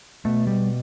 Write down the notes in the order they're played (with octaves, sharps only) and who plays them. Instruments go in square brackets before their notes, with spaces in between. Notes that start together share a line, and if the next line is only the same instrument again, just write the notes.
[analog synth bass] B2 [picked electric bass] A3
[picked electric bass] G3